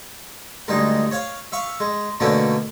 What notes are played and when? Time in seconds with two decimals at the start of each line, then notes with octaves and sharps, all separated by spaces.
0.68 D2 G2 G#3 D#4
1.11 C#5 F5
1.52 E5 F5 C#6
1.80 G#3
2.20 B2 D3 A3 A#3 C#4